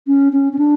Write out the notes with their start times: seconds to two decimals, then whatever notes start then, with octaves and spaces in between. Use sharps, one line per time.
0.07 C#4
0.33 C#4
0.53 C#4
0.58 D4